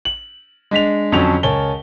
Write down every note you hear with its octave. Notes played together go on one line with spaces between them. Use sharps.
F#7
G#3 D4 B6 F7
F2 D3 F#3 C#4 A5 F7
C#2 A#4 C#5 G#5 A5 G7